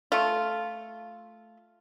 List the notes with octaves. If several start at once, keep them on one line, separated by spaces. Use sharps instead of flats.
A3 F4